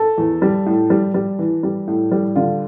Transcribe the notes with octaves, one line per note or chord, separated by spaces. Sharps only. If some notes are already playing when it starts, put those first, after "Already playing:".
Already playing: A4
E2
G3
A2
G3
G3
E3
G3
A2
G3
D3 F4